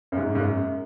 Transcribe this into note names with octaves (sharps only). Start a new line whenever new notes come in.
F#2
G#2
G#2
F#2